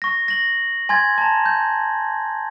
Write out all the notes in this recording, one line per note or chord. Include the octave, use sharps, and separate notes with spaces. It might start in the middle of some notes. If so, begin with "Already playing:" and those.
C#6 A#6
A#6 F#7
G#5 C6 G#6 A6
A5 A#5
G6